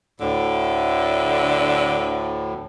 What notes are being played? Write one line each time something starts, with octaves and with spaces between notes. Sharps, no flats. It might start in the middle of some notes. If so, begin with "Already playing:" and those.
D2 A2 D3